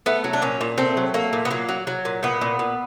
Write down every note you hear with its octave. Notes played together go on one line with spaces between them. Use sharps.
A3 B3
F#3
D4
A#2 C#4
A#2
A3 C4
F#3
A3 A#3
A#2
B3
F#3 A#3
F#3
F#3
A#2
A#2 B3
A#2
A#2